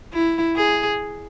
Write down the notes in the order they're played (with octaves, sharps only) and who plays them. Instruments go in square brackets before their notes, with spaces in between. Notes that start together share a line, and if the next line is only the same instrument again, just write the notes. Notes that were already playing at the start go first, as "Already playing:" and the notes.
[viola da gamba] E4
G#4